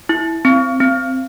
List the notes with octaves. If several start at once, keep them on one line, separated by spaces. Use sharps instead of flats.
E4
C4
C4